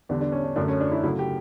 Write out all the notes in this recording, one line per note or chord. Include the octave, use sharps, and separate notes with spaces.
E2 D3 G3 D4
D4
C#4
D4
F#2 D3 A3 D4
C#4
D4
E4
C#3 F#3 A3 E4
G4